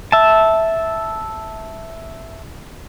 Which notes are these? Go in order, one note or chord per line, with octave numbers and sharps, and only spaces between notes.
E5 A5